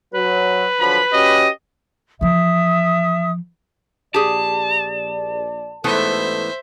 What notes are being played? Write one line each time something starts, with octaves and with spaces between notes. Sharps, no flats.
F#3 B4
D3 F3 F#3 B5
C#4 F#4 G4 D#5
E3 F3 E5 D#6
A#1 G4 G#4 D5 A5
A1 G#2 E3 A3 B3 A4 C5 E5